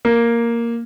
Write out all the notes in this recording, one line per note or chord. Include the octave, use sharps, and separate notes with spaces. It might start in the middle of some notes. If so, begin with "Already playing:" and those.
A#3